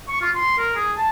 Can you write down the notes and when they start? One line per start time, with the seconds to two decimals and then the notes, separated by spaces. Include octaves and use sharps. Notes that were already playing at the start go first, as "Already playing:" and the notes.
0.08 C#6
0.21 F4
0.35 C6
0.58 A#4
0.76 G#4
0.97 A5